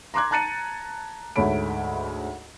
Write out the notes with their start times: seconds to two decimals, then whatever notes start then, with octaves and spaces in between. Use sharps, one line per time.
0.14 A#5 C6 D6 F#6 G#6
0.31 A5 A#5 F#6 A6 C#7 D#7
1.36 D2 G#2 A3 C#5 B5 D7